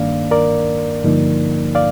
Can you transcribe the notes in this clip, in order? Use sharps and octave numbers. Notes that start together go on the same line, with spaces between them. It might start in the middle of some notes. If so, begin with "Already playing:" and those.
Already playing: G2 D#3 A#3 D4 D5 F5
A#4 D5
G2 D3 F3 A#3 D#4
D5 F5